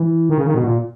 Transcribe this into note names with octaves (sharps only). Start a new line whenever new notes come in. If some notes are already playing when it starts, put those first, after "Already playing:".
Already playing: E3
D#3
C#3
D#3
B2
A#2